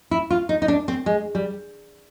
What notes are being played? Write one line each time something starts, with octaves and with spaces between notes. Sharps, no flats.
E4
F4
D#4
D#4
D4
C4
G#3
G3